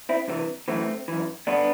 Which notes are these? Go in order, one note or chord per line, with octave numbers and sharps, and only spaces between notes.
C4 E4
C2 C3 E3
F#2 E3 A3 C4
F#2 E3
G2 D3 B3 D4